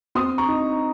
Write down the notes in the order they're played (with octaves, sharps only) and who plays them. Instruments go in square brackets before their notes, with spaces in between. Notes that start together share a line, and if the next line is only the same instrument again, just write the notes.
[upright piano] C4 C6 D#6
A#5 C#6
D#4